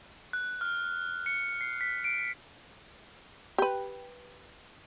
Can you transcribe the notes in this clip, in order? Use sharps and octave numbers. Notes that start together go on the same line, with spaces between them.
F#6
F6
C#7
C7
B6
D7
G4 B4